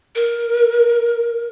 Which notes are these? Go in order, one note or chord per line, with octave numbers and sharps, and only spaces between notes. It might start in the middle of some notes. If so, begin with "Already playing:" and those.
A#4